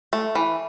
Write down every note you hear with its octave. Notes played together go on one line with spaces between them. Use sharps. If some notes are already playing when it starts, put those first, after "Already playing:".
A3
E3